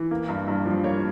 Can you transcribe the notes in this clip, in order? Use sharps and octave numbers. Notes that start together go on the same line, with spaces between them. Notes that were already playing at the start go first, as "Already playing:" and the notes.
Already playing: E3
A#3
G2
G2
F3
A#3 C#5